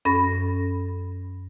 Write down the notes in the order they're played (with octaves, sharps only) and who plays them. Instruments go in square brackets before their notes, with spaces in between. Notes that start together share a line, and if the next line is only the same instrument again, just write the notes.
[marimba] F#2 C#4 A4 B5 A#6